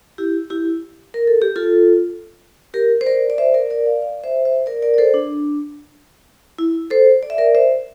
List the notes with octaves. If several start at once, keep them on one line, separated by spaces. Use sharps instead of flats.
E4 G4
E4 G4
A#4
A4
G4
F4 A4
G4 A#4
C5
A#4 D5
D5
C5 E5
A#4 D5
A#4 D5
D5 F5
D5 F5
C5 E5
C5 E5
A#4 D5
A#4 D5
D5
A4 C5
D4
E4
A4 C5
D5
E5
A#4 D5
C5 E5